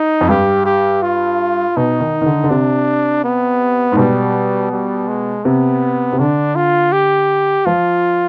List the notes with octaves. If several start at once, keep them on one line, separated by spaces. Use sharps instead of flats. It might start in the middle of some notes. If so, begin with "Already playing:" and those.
Already playing: D#4
F2
G2 G4
G4
F4
B2 D#4
D#3
D#3
D3
D3
C3 D4
B3
G#2
B2 G3
G3
G#3
C3 B3
C3
D3 D4
F4
G4
F3 F4